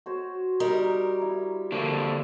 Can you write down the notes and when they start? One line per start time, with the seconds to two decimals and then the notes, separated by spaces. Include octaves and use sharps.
0.06 F#4 C5 C#5
0.60 G3 D#4 A#4
1.22 E4
1.72 D3 A#3 D4 C#6 E6